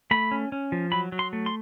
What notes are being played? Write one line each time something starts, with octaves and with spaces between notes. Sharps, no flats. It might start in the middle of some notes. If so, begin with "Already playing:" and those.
A3 B5
C#4
C#4
F3
F#3 B5
F#3
C6
A3
C6